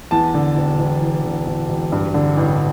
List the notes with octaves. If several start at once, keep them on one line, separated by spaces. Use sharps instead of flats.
E2 A5
D3
E1
E1
E2
D3
E1
E1
G2
D3
A1